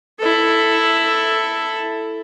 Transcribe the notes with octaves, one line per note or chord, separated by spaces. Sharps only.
E4 A4